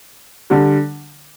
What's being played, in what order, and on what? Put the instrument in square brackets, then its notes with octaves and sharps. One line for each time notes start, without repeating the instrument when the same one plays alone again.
[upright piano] D3 G3